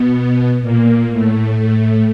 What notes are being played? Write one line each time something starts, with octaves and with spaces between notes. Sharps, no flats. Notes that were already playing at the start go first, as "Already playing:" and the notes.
Already playing: B2 B3
A#2 A#3
A2 A3
A2 A3